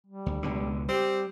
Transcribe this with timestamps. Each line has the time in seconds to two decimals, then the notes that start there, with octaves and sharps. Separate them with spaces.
0.07 G3
0.26 D2
0.43 C#2 B2 D3
0.89 G3 C4 G4